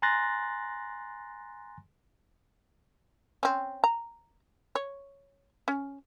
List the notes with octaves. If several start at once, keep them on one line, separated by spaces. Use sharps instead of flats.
G#5 A#5 C6 F#6 A6 A#6
C4 C#4
A#5
C#5
C#4